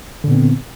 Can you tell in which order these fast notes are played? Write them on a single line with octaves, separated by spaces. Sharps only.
D3 A#2 B3 C4